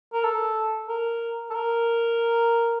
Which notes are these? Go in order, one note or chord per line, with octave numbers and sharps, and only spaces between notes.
A#4
A4
A#4
A4
A#4